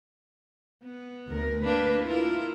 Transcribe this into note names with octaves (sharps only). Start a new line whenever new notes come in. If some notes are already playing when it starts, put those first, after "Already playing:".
B3
D2 A#4
A#3 D4 B4
E4 F4 A#4